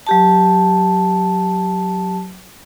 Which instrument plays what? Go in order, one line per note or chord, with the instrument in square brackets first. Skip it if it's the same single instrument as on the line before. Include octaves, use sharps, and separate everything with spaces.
[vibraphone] F#3 G4 A5